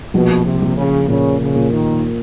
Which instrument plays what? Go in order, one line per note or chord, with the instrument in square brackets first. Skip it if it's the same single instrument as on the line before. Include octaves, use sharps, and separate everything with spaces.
[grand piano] A#1 [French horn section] B2
[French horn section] C3
[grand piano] A#1
[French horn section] C#3
[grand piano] A#2 [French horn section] C#3
[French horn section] C#3
[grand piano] A#2
[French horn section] D#2 D#3